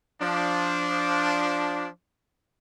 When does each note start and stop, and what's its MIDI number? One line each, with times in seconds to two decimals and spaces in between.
0.22 1.87 53
0.22 1.87 62